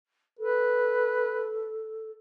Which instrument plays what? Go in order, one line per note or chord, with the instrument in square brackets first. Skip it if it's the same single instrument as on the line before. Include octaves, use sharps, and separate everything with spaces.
[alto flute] A4 [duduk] B4